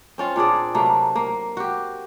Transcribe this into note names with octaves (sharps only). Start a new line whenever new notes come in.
C4 C#4 F4
A#2 D4 G#4 D5
C3 F#3 A3 A#3
A#3
F#4 G4